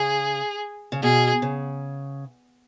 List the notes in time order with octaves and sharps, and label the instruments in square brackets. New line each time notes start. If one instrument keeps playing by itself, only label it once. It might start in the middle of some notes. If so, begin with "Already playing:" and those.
Already playing: [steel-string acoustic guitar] C#3 [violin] G#4
[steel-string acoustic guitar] C#3
[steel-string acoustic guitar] B2 [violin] G#4
[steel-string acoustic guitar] C#3